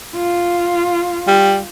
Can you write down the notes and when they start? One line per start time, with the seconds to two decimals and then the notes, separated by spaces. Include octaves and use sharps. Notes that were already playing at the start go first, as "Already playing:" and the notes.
0.16 F4
1.27 G3